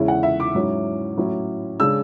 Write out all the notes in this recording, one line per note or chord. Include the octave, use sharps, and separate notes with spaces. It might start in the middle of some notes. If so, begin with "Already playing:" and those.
Already playing: E2 C#3 G#3 C#4 E4
F#5
E5
D6
G#2 F#3 C#4 E4
A2 F#3 C#4 E4
C#3 G#3 D4 E6